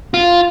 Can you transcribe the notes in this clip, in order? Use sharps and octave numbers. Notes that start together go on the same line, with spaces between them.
F4